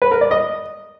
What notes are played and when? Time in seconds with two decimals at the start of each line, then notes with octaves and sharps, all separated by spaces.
0.02 B4
0.11 A#4
0.21 D5
0.31 D#5